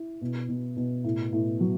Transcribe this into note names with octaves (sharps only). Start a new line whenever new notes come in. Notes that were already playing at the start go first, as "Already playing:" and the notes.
Already playing: E4
B2
B2
B2
A2
A2
F#3